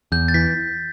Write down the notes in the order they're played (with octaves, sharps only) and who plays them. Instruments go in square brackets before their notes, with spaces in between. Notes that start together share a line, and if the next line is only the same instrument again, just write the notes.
[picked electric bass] E2 [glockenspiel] G6
[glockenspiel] A6
[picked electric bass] E3 [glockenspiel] B6